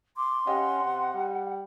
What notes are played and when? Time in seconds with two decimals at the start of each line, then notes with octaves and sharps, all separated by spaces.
0.17 C6 D6
0.47 C#4 G4 D#5 F5 F#5
0.83 C3
1.14 G3